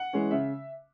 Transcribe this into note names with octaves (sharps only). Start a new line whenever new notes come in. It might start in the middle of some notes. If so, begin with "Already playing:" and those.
Already playing: F#5
E3 G#3 C#4
C#3 E5